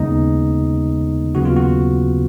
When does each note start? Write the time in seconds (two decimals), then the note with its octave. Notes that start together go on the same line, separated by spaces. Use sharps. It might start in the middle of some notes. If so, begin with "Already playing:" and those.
Already playing: D#2 C#3 G#3 B3 D#4 D#5
1.35 D#2 C#3 F#3 B3 F#4
1.45 F4
1.56 F#4